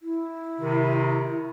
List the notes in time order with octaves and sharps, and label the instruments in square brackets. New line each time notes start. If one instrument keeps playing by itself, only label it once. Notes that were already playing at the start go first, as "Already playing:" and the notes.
[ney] E4
[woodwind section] C3 D#3